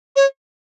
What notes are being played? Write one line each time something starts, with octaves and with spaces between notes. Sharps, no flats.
C#5